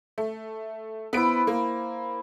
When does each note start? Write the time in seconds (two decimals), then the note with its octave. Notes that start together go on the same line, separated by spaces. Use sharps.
0.18 A3
1.13 B3 E4 C5 B5 D7
1.47 A#3